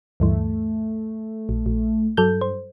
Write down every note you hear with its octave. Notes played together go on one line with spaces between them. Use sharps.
D2 G2 E3 A3
A#1
A#1
G2 F#3 A4 G6
C5